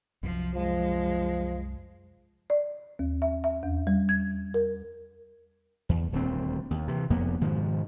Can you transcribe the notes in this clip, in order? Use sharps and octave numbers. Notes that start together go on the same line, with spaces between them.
C2 F#2 F3
F3 G#3
D5
D#2
E5
E5
E2
G3
G#6
A#4
E2
D#1 D2 C4
D#2
C3 E3
F1 F2 A#3 B3
G#2 B2 D#3 F3